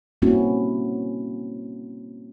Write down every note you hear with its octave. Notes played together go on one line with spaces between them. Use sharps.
G3 A#3 C4 C#4 E4 F#4